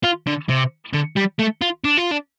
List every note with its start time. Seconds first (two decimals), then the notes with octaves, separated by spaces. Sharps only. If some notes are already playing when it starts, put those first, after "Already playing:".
0.04 F4
0.27 D3
0.49 C3
0.94 D3
1.17 G3
1.39 A3
1.62 F4
1.85 D4
1.98 F4
2.11 D4